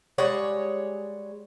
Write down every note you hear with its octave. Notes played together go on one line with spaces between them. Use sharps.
G3 G#3 C#5 F#5